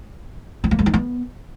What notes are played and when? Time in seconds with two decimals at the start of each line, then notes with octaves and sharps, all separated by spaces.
0.64 C4
0.71 A#3
0.79 G#3
0.86 D#4
0.94 B3